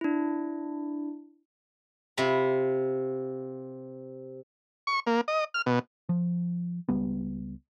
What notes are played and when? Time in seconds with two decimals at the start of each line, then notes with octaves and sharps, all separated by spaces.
0.01 D4 E4
2.17 C3 F4 B5
4.87 C#6
5.07 A#3
5.28 D#5
5.54 F6
5.66 B2
6.09 F3
6.89 C#2 G3 B3